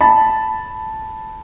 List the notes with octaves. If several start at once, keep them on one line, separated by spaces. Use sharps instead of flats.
A5 B5